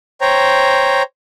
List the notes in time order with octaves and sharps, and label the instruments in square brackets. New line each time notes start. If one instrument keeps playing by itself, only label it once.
[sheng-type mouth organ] C5 C#5 G5 A#5